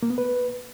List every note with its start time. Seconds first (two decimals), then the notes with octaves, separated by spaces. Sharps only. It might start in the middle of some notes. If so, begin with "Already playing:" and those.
0.03 A#3
0.10 B3
0.18 B4